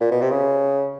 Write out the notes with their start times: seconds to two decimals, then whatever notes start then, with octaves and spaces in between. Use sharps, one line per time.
0.01 A#2
0.11 B2
0.21 C3
0.31 C#3